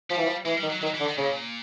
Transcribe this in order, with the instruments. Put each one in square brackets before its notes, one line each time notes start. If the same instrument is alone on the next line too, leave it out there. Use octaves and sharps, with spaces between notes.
[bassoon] F3 [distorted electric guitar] G3
[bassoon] E3
F3
[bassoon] E3 [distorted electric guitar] G#3
[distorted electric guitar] G3
[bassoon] D#3
[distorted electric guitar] F#3
[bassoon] D#3 [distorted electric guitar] F#3
[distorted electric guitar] E3
[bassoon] D3
[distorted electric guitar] D#3
[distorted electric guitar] A#2 [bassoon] C#3